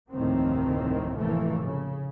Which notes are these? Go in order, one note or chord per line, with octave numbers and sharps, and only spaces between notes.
F1 D2 A2 D#3 A#3 C4
F1 A2 E3 F3 A3 A#3
C#3